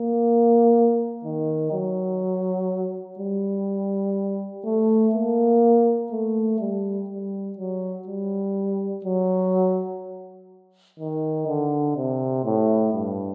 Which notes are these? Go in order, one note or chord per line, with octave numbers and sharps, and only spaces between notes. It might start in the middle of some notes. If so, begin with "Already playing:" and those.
Already playing: A#3
D#3
F#3
G3
A3
A#3
A3
G3
G3
F#3
G3
F#3
D#3
D3
C3
A2
G2